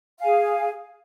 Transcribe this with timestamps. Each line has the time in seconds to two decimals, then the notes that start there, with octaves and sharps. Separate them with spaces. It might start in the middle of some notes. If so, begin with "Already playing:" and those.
0.19 F5
0.22 G#5
0.25 G#4